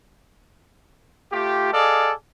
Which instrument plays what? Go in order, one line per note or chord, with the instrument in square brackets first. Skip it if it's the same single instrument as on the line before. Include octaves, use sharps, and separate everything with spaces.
[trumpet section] A3 F4 G4
G#4 A4 D5 D#5 F5